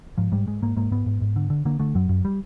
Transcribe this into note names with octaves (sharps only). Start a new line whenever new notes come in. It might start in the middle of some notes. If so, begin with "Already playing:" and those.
G#2 F3
G#2 G3
G#2 G#3
G#2 A#3
G#2 A#3
G#2 B3
G#2
G#2
D3
D3
D3 A#3
D3 A3
F#2 F#3
F#2
G3